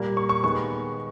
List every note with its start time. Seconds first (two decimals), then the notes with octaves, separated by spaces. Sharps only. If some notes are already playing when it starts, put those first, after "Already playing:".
Already playing: A#2 G3 A#3
0.17 C#6
0.29 C#6
0.43 D#3 G#3 B3 C#6